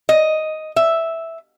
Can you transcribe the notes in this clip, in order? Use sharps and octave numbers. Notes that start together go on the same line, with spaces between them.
D#5
E5